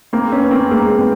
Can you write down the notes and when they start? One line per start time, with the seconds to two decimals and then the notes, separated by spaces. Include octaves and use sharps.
0.13 A#3 C4
0.32 B3 C#4
0.51 A#3 C4
0.71 G#3 A#3
0.91 B3
0.98 C4